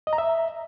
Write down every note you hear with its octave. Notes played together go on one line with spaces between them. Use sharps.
D#5
A#5
E5